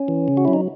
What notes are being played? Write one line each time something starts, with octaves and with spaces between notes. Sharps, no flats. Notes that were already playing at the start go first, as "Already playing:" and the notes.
Already playing: C#4
E3
C#3
F#4
E4
F#3
D#4